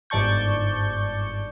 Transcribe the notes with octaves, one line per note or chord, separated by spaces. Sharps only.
G1 G#2 D5 A5 C#6 G6